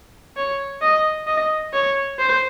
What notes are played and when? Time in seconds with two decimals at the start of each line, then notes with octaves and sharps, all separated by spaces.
0.37 C#5
0.82 D#5
1.27 D#5
1.74 C#5
2.19 C5